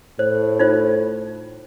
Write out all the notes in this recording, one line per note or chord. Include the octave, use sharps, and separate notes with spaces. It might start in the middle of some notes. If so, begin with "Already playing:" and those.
A2 C5
D#4 F4 C5